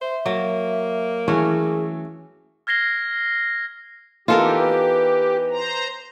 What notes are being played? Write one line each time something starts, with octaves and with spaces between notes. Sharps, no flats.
C5 E5
F#3 A#3
E3 A3 C#4 F#4 G#4
F6 G#6 A#6 C7 G7
E3 B3 D#4 F4 G4 A4 A#4
B4
C5 A#5